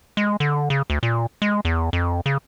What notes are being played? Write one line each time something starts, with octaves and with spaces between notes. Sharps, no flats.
G#3
D3
C#3
D2
A#2
G#3
E2
F2
C#3